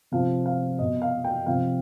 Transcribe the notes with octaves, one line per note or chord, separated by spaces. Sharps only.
C3 F3 F5
F5
B2 D#5
F5
G5
C3 F3 F5